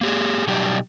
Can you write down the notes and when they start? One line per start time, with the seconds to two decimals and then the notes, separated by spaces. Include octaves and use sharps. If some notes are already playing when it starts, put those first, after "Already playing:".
0.01 A#3 G4 G#4
0.47 B2 F#3 G3 D#4 G4